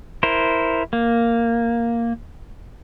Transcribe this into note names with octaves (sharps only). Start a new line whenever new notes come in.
E4 A#4 C5
A#3